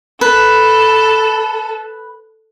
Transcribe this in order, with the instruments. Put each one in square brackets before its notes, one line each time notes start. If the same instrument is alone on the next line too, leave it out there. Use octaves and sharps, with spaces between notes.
[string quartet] A4 [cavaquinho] B4